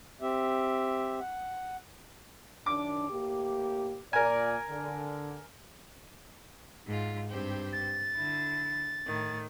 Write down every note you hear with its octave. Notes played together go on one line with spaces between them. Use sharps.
C4 G4 E5
F#5
F#2 D#3 D4 D6
A2 A#3 G4
A#2 A#4 D5 G#5
D3
G#2 F4
G2 C4 G4
A6
D3 E4
A2 D#3